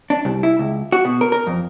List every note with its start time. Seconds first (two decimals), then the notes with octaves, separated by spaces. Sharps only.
0.10 D4
0.25 C2
0.43 E4
0.59 C#2
0.92 F#4
1.05 B2
1.21 A#4
1.32 A#4
1.47 F2